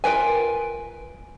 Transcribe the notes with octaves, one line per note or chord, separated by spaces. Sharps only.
F4 A#4 B4 G#5